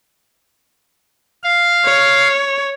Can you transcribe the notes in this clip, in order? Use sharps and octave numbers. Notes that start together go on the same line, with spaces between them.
F5
C#5